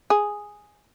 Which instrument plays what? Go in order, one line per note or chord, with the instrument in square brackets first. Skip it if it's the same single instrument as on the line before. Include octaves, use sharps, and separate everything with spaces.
[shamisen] G#4